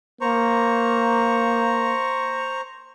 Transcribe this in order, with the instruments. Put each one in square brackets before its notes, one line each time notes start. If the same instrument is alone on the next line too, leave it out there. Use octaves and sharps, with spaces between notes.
[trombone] A#3 [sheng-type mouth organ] C5 A#5 C#6